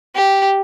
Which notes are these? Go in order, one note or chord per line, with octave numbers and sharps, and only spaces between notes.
G4